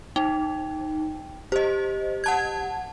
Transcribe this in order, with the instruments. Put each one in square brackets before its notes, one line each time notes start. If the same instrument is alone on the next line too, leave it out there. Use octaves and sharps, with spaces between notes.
[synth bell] D#4 [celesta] G5
[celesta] G4 [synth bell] C5 D#5
[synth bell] F#5 A5 G#6